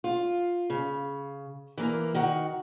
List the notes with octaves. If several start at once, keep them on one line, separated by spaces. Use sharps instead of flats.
F4
C#3
E3 A#3 A#4
D#3 F#4